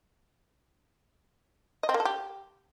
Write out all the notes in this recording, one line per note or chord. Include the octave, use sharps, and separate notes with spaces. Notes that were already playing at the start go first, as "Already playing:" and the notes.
D#5
C4
A#3
A4
G4